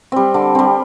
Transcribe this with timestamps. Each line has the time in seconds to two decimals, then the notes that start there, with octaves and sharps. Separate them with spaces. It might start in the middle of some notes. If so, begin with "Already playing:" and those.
0.12 G3 C4
0.34 D3
0.55 G3 C4